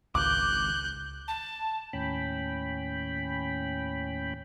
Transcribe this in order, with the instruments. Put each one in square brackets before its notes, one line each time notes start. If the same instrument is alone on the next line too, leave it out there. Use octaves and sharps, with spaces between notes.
[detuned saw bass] G#1 [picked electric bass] C#2 [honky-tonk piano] D6 [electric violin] F#6 G6
[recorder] A5
[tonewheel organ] D#2 A2 C#4 G5 B5